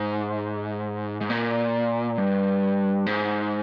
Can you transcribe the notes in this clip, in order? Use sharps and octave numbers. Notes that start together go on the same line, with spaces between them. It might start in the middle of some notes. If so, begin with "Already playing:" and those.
Already playing: G#2
G#2
A#2
G2
G#2